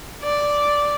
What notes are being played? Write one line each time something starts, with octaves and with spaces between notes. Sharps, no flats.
D5